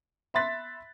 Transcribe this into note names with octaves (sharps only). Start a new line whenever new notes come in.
E5 B5 C6 F#6 A6 B6